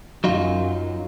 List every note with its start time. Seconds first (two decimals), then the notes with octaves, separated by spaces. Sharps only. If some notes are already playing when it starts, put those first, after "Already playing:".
0.24 F#2 F#3 D#4 F4